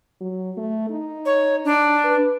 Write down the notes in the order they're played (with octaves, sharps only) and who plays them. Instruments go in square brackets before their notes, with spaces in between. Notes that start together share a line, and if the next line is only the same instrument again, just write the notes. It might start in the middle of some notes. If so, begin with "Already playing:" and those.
[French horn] F#3
A3
D#4
[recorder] C#5
D4
[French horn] B4